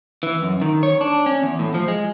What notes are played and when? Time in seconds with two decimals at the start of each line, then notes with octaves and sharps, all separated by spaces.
0.23 E3
0.42 F#2
0.61 D#3
0.83 C#5
1.01 D4
1.26 C#4
1.43 E2
1.59 A2
1.74 F3
1.88 G#3